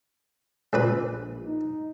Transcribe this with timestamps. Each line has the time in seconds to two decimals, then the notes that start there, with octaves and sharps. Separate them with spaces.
0.73 C#2 A#2 B4
1.10 A#1
1.45 D#4